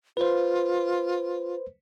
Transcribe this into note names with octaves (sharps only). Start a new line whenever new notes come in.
F4 B4 C5